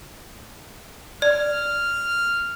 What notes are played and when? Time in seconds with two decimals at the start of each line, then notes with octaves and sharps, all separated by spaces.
1.22 D5 F6